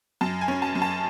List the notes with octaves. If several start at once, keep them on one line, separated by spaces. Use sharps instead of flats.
F#2 A5
G#5
C#4
A5
F#2
A5